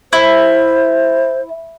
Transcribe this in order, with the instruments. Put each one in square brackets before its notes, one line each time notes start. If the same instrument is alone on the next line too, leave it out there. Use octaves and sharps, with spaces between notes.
[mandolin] E4 [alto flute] C5